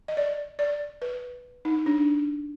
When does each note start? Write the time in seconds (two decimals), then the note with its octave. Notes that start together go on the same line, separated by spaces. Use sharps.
0.08 D#5
0.17 D5
0.59 D5
1.02 B4
1.65 D#4
1.86 D4